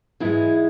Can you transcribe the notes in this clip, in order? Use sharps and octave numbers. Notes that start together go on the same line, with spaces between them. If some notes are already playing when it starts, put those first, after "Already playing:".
G#2 E3 G#3 E4